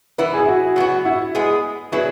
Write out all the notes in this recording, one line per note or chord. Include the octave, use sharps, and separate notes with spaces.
E3 B3 E4 B4
G#4
E4
F#4
F#3 B3 F#4
E4
G#3 B3 G#4
F#3 B3 E4 G#4